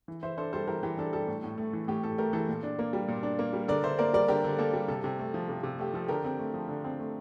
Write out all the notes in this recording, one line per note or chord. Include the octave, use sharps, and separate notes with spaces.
E3
E3 C5 E5
D4 A4 C5
G3 A4 C5
E3 G4 A#4
E3 G4
D4 A4
G3 A4
A2
A2
A3
E3
A2 G4
A2 A4
A3 G4 A#4
E3 A4
A#2
D4
A#3
G3
A#2
D4
A#3
G3
D3 A#4 D5
D3 C5 E5
A#3 A#4 D5
G3 A#4 D5
D3 G4 A#4
D3
A#3 A4
G3
C3 A4
C3
A3
F3
C3
C3
A3 G4
F3 A4
D3 G4 A#4
C4
A3
F3
D3
C4
A3